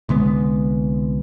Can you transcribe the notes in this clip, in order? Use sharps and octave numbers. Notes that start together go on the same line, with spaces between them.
C2 D3 G#3 B3